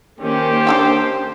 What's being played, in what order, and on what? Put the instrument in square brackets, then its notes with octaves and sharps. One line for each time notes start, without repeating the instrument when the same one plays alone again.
[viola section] D#3 A#3 C#4 [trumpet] G4 [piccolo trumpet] C5
[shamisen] D4 A4 G5